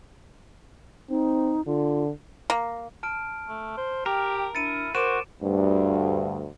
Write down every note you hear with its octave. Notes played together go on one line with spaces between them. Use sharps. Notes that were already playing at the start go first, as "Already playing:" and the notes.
C4 D#4
D3 F4
A#3
A5 F6 D7
A3
C5
G4 A#4 G5
D4 E4 A6 C#7 D#7
F#4 A#4 C5 D6 D7 E7
D2 G2